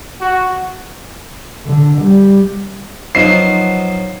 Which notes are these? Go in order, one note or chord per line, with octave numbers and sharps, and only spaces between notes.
F#4
D3
G3
F3 F#3 B3 D#4 C5 D#5 C7